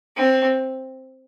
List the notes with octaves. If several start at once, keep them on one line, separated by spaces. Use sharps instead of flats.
C4